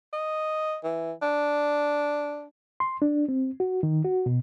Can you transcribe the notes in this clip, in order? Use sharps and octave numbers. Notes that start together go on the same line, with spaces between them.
D#5
E3
D4
C6
D4
C4
F#4
D#3
F#4
B2